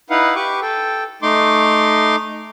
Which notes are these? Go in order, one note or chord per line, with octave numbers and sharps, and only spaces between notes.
D#4 E4 B4 F5 F#5
G4 B4 C#6 D6
A4 G5
A3 D#4 C6 D6